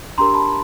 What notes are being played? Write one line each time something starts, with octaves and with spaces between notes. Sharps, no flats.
D4 G4 A#4 A#5 C6
A5 B5